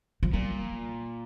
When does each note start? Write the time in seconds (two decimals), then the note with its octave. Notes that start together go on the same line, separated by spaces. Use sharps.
0.23 F3
0.34 A#2 G3